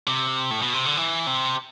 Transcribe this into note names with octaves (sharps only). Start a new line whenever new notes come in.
C3
A2
B2
C3
D3
E3
C3